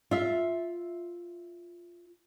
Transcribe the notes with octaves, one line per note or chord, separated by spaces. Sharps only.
F4 E5